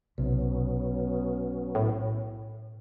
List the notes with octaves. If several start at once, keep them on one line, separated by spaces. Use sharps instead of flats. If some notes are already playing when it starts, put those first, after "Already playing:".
B1 C3 F#3 B3 C#4
A2